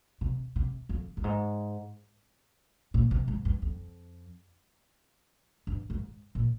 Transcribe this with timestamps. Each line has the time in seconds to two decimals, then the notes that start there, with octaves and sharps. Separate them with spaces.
0.21 C3
0.56 C3
0.89 F2
1.17 G2
1.24 G#2
2.94 A#2
3.11 C3
3.28 G#2
3.45 G2
3.62 F2
5.67 G2
5.90 G#2
6.35 A#2